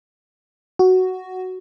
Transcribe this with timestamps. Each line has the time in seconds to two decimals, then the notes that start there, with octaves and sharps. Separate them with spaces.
0.79 F#4